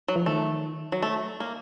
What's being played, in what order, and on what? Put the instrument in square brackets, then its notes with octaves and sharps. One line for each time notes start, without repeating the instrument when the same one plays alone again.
[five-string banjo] F#3
[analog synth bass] F3
[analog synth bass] D#3 [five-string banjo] A3
[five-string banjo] F#3
A3
A#3